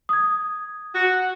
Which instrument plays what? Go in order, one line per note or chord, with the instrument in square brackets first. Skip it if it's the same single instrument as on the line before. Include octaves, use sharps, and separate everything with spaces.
[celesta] D#6 G#6
[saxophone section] F#4